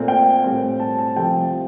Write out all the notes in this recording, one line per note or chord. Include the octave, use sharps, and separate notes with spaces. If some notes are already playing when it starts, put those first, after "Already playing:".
Already playing: A#2 A3 C4
G5
A2 G3 C4
A5
A5
C3 F3 A3 C4 G5